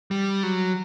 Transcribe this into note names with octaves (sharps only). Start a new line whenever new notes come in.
G3
F#3